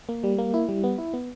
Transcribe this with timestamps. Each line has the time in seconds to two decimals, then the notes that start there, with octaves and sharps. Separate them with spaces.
0.09 A#3
0.24 G3
0.38 A#3
0.54 E4
0.69 G3
0.84 B3
0.98 E4
1.14 B3